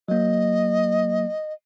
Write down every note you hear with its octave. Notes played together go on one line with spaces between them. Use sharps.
F#3 A#3 D#5